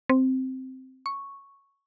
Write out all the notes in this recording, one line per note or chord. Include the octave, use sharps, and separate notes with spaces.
C4
C#6